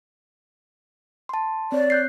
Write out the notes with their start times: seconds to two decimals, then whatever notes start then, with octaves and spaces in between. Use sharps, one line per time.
1.29 A5 C6
1.72 C4 C#5 D5
1.90 F#6 G6 C7